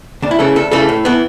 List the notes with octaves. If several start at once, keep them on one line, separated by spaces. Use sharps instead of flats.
D2 D4
E4
C#3 E3 A3 A4
D2 A4
C#3 E3 A3 A4
A2
E3 B3